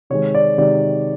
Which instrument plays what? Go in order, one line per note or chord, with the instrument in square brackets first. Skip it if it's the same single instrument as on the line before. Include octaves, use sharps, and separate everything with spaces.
[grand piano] C3 D#3 G#3 C#5
D5
C3 D#3 G#3 D5